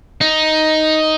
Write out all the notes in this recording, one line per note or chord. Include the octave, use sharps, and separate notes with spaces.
D#4